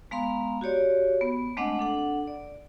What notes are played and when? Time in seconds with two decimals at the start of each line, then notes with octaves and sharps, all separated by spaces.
0.11 G#3 B3 F5 A#5 C6
0.61 F#4 G4 C#5 D5
1.21 B3
1.57 G#3 A3 C4 D4 D#5 F#5
1.79 D4 A4 F#5
2.27 D5